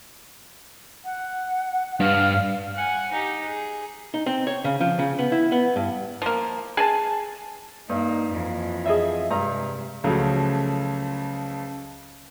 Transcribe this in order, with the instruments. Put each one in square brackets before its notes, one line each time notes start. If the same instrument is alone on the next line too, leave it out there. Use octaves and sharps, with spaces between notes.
[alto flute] F#5
[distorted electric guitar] G2 [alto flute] F5
[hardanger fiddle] F#5 G#5
D#4 G4
G#4
[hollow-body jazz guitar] D#4
C4
C#5
C#3
F3
C#3
B3
E4
B3
G2
[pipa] F3 A#3
G#4 G#5 A5
[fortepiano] G2 [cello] A#3 D#4
[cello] F2 E3
[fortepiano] G#4 D#5 E5
[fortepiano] G2 A#5 [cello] C3 G#3
[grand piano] C#2 C#3 F3 F#3 A3